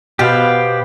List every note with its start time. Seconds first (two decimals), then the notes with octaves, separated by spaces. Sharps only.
0.19 B2 B3 G4 C5 F5